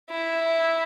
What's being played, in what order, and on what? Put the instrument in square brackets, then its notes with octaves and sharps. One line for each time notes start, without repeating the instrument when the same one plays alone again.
[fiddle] E4